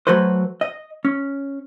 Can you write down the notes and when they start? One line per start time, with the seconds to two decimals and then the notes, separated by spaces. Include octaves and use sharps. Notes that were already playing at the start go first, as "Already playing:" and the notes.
0.07 F#3 A3 F#4 B4 C5
0.61 D#5
1.05 C#4